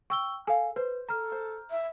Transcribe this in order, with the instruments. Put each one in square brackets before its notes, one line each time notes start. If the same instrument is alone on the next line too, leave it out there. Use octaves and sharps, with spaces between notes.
[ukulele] G5 [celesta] C#6 E6 G7
[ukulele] A4 F5 [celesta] G#5
[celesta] B4 [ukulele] C5
[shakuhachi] A4 [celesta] A#5 F6
[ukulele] C5
[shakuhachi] E5